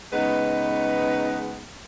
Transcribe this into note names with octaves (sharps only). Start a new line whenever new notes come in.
C#3 G#3 B3 D#4 B4